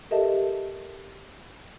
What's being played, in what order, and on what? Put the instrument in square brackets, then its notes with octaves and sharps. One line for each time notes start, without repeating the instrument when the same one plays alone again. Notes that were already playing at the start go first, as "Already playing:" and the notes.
[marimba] G4 A4 A#4 D#5 E5 A5